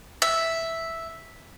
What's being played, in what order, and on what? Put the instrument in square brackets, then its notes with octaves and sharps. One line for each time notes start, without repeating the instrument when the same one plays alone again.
[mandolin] E5